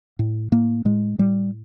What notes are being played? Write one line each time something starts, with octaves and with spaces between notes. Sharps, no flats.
A2
A2 A#3
A2 G#3
A2 G3